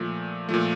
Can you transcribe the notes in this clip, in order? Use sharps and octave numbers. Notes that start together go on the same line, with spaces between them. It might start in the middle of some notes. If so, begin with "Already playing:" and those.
Already playing: A#2 F3 A3
A#2 F3 A3